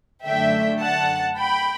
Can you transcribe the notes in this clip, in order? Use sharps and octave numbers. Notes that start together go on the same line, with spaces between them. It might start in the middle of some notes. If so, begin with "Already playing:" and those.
F#2 D3 A3 E5 G5
F#5 A5
G5 B5